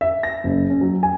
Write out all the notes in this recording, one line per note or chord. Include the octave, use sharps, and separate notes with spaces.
E5
A#6
F#1
C#4
F#3
G#5